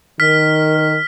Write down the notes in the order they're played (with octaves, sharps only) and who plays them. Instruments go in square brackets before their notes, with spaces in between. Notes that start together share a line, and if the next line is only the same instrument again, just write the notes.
[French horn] D#3 [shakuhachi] A#4 [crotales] F6 B6